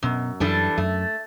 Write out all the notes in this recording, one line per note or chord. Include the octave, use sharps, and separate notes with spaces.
F#2 B2
F#2 E3 G3 D4 A4
F#2 A3